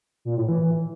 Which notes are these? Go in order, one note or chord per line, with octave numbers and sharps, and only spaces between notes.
A#2
A2
E3